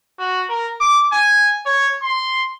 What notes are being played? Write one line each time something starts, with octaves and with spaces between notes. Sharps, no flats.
F#4
A#4
D6
G#5
C#5
C6